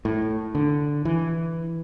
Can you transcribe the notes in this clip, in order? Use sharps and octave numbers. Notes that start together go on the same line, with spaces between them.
A2
D3
E3